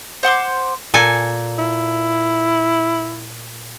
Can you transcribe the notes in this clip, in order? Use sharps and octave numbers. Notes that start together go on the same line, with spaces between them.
C5 F#5 C6 D6
A#2 A4 G#5
E4